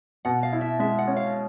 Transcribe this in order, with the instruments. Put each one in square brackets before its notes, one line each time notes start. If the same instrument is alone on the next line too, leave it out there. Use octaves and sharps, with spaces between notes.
[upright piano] B2 [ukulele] F#5
[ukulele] F5
[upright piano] E4
[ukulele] E5
[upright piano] G#3 [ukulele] E5
[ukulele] F#5
[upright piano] C#4
[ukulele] F5